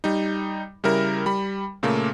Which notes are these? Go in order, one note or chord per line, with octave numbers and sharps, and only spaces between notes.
G3 D#4
C#3 G3 E4 A#4
G3 B5
A#2 C#3 A3 A#3